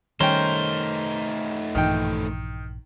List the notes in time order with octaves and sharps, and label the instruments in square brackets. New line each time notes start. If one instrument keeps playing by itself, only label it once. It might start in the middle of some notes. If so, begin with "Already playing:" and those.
[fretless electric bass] D#3 G3 [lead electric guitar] A3 D#4 [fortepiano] C#4 G5 [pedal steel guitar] A#4 C5
[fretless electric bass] A#1 G2 E3 [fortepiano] D#3 G5